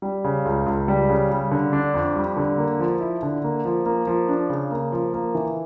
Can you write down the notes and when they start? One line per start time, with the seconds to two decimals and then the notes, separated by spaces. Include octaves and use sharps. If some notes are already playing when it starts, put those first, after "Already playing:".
0.02 G3
0.24 C#3
0.46 C#2
0.66 C#2
0.88 G3
1.09 C#3
1.31 G3
1.51 D3
1.73 D4
1.94 F2
2.16 G3
2.37 D3
2.58 A#3
2.79 F3
3.01 E4
3.23 D3
3.44 A#3
3.65 F3
3.86 A#3
4.07 F3
4.28 D4
4.50 C#3
4.71 A#3
4.92 F3
5.13 A#3
5.35 E3